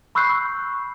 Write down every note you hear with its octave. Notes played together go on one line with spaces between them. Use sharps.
B5 C#6 E6 F#6 G6 C7